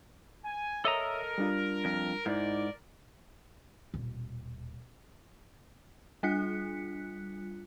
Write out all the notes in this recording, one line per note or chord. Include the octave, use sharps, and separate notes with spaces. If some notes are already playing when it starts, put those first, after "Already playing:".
G#5
A4 A#4 C#5 D#5 E5 A#5 E6
G3 D4 F4
F2
G#2 D#4 E4 A#4 D5
D#1 B2
G3 D4 F4 F#6 B6 C#7